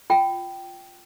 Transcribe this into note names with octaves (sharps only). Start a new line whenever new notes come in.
F4 G5